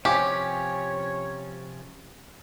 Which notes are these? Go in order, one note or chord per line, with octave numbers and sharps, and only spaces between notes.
C3 F3 C#4 G4 C#5 F5 G#5 C#6